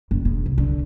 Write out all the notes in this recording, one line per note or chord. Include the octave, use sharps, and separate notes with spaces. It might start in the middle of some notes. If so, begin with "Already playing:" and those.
F#1
E1
C2
D3